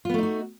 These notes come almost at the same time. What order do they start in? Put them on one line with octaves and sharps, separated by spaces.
F4 B3 A3 D#4 F#4